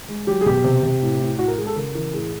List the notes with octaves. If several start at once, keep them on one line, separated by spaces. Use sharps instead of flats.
G#3
F#3 G4
G#4
B2 G4
C3
C3
A2
A2
A2 F#4
A#4
G#3 G#4
A4
C#3 A#4
E3 A#4
A2 G#4